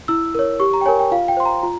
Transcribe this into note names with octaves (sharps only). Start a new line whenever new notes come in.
E4 E6
A#4 C#5
G4 C#6
A#5
G5
A#4 C#5 G#5
G5
F4 F5
G5
C5 C6
A#5
F4 A#5